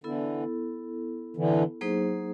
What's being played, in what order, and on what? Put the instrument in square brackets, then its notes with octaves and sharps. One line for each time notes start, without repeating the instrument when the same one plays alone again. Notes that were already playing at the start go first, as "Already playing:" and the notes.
[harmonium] D3 E3 [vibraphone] B3 E4 A4
[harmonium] D3 E3
[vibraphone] F#3 A#3 D#4 G#4 C5